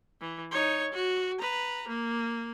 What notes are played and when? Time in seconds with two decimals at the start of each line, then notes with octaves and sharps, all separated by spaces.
0.21 E3
0.51 D#4 C#5
0.93 F#4
1.39 B4 A#5
1.88 A#3